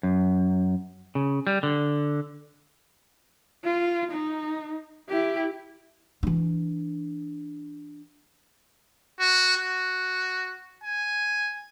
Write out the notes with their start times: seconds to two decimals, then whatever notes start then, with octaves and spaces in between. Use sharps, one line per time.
0.03 F#2
1.15 C#3
1.47 G3
1.63 D3
3.64 F4
4.11 D#4
5.09 E4 G4
6.23 E3 D4
9.19 F#4
9.58 F#4
10.84 G#5